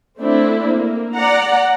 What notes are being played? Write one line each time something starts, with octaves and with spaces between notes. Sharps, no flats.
A3 C4 D4 E4
A#3
D5 F#5 A#5